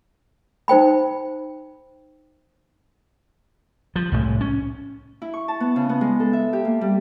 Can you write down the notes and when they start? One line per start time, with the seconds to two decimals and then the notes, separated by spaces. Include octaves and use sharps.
0.68 D#4 C5 G5 B5
3.96 F3
4.12 C2 A2 G#3
4.41 C#4
5.22 E4
5.34 C#6
5.48 A5
5.60 B3
5.76 C#3
5.89 B3
6.01 G#3
6.20 A4
6.33 E5
6.53 G4
6.65 A#3
6.81 G3